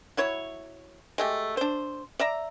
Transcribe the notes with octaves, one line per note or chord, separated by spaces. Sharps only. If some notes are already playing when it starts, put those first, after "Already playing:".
F#3 E4 C#5
G#3 A3 G4
D4 C5
D5 E5 A#5